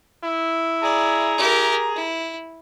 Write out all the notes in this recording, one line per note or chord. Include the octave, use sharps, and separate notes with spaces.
E4
G#4 D5 A#5
G4 A#4
E4